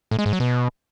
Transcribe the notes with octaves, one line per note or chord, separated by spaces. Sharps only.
A2
G#3
G#2
F#3
B2